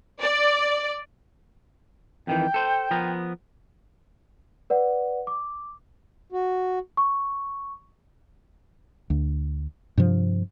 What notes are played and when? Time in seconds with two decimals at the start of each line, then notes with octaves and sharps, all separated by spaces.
0.20 D5
2.27 F2 D#3 E3 G5
2.54 A4 C5
2.91 F3 B3 A#4
4.70 B4 D5 F#5
5.27 D6
6.32 F#4
6.97 C#6
9.10 D2
9.97 G2 C3 F3